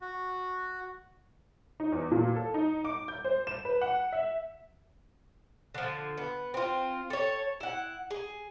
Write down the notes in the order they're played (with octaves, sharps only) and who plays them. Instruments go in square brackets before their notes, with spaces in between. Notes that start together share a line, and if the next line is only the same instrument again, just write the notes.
[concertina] F#4
[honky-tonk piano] D#4
E2
A#2
A4
D#4
D6
G6
C5
E7
B4
F#5
E5
[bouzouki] D3 F3
B3
C4 F4
A4 C#5
E4 F#5
G#4